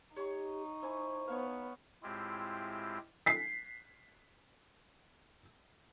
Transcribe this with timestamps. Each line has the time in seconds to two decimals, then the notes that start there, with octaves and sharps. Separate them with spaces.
0.16 D#4 G4 C#5 C6
0.82 E4 C5 G#5 C#6
1.28 B3 C#5 E5 F5
2.03 A2 G#3 C4 E4 F4 G4
3.26 B6 C7